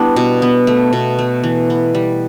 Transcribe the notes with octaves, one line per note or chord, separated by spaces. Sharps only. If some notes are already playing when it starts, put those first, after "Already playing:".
Already playing: G3 B3 D4 E4
B2
B3
A3
B2
A3
E3
B3
G3